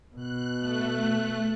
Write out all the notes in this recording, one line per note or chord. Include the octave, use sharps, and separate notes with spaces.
B2 F#6
A3 F#6